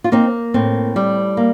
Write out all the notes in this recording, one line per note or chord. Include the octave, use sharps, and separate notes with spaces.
F4
A#3 C4 D#4
A2 C4
G3
A#3